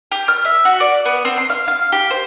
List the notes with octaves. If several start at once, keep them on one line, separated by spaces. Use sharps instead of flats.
G4
F6
E5
F#4
D5
B3
C4
C6
F5
F5
G4
C5